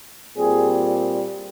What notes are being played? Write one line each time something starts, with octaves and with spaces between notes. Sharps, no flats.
A#2 G3 C4 G#4